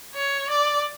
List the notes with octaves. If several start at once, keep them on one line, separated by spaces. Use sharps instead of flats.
C#5
D5